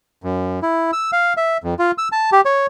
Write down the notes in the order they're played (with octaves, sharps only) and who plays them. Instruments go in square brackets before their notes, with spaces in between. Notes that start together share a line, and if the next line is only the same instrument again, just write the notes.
[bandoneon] F#2
E4
E6
F5
E5
F2
F4
E6
A5
G4
C#5